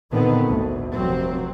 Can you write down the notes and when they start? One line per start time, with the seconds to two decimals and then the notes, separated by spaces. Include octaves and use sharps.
0.11 A#2 D3 D#3 B3 C4
0.46 G#1 D2
0.93 F1 F#3 C4